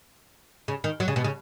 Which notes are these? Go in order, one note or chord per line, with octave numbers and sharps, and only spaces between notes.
C#3
D#3
F#3
C#3
B2
C#3